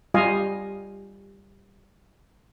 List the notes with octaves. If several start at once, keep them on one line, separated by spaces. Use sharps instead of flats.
G3 F4 G4 D#5 F5 G#5